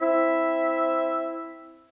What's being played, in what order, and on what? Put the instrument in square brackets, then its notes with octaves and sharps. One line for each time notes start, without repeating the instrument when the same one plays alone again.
[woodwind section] C4 E4 E5